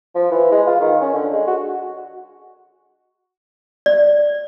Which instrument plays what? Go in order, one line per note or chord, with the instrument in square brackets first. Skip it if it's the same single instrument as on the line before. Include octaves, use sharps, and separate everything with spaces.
[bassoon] F3
E3
G#3
F4
D#3
C#4
D3
G#3
F#4
[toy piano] D5